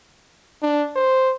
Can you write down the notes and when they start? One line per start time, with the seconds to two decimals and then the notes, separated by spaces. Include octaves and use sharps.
0.63 D4
0.96 C5